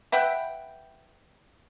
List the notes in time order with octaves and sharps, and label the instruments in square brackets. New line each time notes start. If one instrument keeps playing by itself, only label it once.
[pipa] B4 E5 F#5 G5